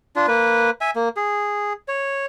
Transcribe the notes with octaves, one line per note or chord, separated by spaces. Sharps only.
D4 F4
A#3 B4
E5 G#5
A#3
G#4
C#5